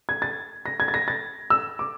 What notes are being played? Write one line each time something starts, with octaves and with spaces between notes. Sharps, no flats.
G#6
A6
A#6
G#6
A6
A#6
A6
E6
D6